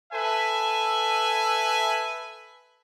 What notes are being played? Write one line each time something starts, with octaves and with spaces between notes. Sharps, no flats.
A4 B4 E5 G#5